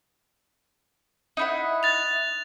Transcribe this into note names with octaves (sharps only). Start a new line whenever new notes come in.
D#4 E4 F#5
F#6 A6 F7